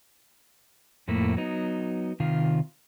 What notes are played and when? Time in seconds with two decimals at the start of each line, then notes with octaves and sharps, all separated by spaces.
1.08 F2 A2 A3 A#3 E4
1.37 F#3 B3 D#4
2.20 C3 D#3 F4